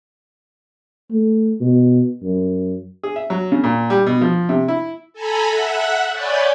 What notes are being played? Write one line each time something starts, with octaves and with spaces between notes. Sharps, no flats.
A3
B2
F#2
G#4
E5
F#3
C#3
A#2
G3
B2
F3
C3
E4
A4 G#5 A#5 B5
E5 F#5 F#6
C#5 D5 G#5 B5 G6 A6